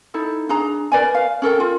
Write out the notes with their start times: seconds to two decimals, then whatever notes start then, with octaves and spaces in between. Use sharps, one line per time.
0.14 D#4 E4 A4
0.49 D4 G#4 A#5
0.92 A#4 B4 D5 G#5
1.15 F5
1.42 C#4 A4 A#4 G5
1.60 F4